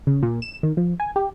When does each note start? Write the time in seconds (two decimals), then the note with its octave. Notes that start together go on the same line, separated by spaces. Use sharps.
0.07 C#3
0.23 A#2
0.42 E7
0.63 D#3
0.77 F3
1.00 G#5
1.16 G4